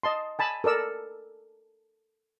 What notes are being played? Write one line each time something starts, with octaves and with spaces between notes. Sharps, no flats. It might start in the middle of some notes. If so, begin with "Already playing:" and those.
D#5 A5 C6
G#5 A5 B5
A4 A#4 D5 E6